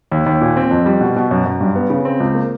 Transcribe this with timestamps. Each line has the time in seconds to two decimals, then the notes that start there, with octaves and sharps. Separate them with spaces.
0.11 D#2
0.26 D#2
0.41 A#2
0.57 C4
0.71 F2
0.86 G3
1.01 B2
1.16 B2
1.31 F#2
1.46 F#2
1.61 G2
1.76 B3
1.90 C#3
2.05 C4
2.20 C#2
2.35 A#3